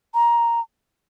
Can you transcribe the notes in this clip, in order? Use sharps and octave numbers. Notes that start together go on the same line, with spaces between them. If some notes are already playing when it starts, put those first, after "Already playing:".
A#5